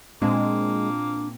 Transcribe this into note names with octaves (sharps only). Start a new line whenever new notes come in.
A#2 G#3 A#3 C4 D4 F5 A5